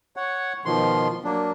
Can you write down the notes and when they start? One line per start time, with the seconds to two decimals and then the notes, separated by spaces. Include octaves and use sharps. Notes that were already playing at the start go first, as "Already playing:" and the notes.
0.16 C#5 F#5
0.65 B2 D#3 F3 C6
1.24 F#3 A#3 D4